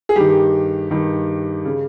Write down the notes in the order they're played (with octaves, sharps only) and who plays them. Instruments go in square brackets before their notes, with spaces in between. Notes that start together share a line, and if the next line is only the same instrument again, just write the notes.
[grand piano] G#4
G2 D#3 G4
G2 D#3
C#3